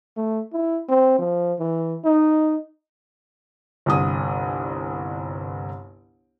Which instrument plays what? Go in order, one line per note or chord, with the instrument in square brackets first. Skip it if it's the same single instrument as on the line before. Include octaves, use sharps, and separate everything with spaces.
[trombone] A3
E4
C4
F3
E3
D#4
[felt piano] G1 C2 D#6